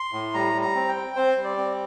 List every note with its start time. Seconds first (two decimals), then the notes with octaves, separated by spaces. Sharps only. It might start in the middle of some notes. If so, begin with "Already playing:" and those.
Already playing: C6
0.13 A2
0.34 G3 A#5
0.54 G3
0.62 A#5
0.75 C4
0.89 G5
0.96 C4
1.16 C4 C5
1.37 G3
1.44 D5
1.58 C4